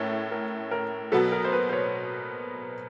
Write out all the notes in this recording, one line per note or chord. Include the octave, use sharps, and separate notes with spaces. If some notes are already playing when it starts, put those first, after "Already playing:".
Already playing: A2 A3 C#4 A#4
A#4
A#4
B2 F#3 B3 A4
A#4
C5
B4
C5
C#5